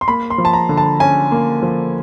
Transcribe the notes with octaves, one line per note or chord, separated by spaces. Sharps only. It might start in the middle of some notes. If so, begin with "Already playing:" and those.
C6
A#3 B5
C6
F3
A5
A#5
D3
A5
C#4 G#5
A#3
F3